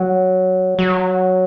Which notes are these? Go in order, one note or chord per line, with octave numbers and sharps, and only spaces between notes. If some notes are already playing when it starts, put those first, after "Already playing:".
Already playing: F#3
F#3